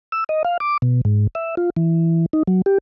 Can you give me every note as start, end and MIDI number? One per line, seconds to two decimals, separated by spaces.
0.12 0.24 88
0.29 0.43 75
0.45 0.58 77
0.60 0.77 86
0.82 1.01 47
1.05 1.27 44
1.35 1.55 76
1.57 1.70 65
1.76 2.26 52
2.33 2.43 63
2.47 2.62 54
2.66 2.78 67